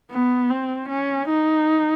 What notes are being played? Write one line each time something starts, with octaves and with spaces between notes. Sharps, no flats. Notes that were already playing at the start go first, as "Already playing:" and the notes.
B3
C4
C#4
D#4